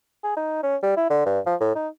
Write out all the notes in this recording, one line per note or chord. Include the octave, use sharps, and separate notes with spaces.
G#4
D#4
C#4
G3
E4
D3
G2
F3
A2
D#4